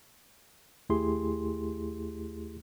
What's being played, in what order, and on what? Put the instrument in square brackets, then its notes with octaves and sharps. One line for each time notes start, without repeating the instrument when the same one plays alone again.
[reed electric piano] D#2 A3 E4 G4 G#4 C6